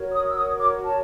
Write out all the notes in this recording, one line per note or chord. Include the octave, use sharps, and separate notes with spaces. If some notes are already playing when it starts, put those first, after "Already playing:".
Already playing: F#4 A#4 C#5
D#6
E6
D#6
D6
A5